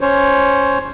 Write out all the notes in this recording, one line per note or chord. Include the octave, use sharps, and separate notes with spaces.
C#4 C5 C#5